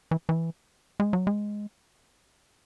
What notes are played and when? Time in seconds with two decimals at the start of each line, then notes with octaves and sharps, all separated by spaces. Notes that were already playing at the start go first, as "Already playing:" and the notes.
0.11 E3
0.29 E3
1.00 G#3
1.13 F#3
1.27 G#3